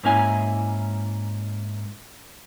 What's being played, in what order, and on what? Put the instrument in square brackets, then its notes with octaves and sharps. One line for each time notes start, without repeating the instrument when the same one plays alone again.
[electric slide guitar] G#2 A#3 C#4 E4 G#5